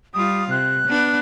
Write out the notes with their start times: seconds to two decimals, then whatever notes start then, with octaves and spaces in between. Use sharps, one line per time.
0.14 G3 F4 D#6
0.50 C3 F#6
0.88 B3 D4